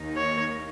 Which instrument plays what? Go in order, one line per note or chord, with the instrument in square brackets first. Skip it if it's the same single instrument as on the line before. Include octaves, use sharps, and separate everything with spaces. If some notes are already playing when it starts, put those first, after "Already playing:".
Already playing: [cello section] D#2 D#3 A#3 D#4
[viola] C#5